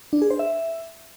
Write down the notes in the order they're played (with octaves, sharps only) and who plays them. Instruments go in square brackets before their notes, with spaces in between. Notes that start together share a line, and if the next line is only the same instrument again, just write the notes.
[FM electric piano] D4
G#4
C5
E5